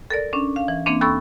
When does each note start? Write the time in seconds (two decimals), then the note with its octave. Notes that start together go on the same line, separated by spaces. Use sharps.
0.10 A4 A#4 D5
0.33 C#4 D4
0.56 F5
0.68 E3
0.86 E3 A#3 C4 D4
1.01 D#2 A4 B5 C#6 E6